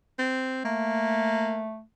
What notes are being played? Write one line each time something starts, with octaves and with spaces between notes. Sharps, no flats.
C4
A3 A#3